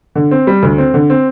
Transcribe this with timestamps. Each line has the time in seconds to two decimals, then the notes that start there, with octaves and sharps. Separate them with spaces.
0.16 D3
0.31 C4
0.47 G3
0.63 D2
0.78 C4
0.94 D3
1.10 C4